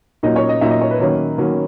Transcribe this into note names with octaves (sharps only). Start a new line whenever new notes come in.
A#2 F#3 A#3 D#4 D#5
C#5
D#5
A#2 F#3 A#3 D#4 E5
D#5
C#5
B4
D#3 F#3 A#3 C#4
D#3 F#3 A#3 C#4